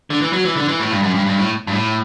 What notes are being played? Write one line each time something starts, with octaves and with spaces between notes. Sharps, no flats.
D3
E3
F#3
E3
D3
E3
A2
G2
F#2
G2
G2
A2
G2
A2